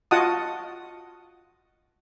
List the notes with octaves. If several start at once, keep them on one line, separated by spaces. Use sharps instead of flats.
F4 F#4 D#5 F#5 A5 D#6